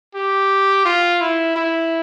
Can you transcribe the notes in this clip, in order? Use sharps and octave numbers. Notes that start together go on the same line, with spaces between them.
G4
F4
E4
E4